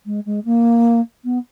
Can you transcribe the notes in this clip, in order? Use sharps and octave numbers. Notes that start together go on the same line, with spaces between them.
G#3
G#3
A#3
B3